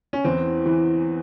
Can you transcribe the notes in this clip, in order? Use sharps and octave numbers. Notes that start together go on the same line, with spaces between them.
C#4
E2 E3 C4
E3